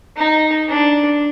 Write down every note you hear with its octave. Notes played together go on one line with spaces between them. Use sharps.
D#4
D4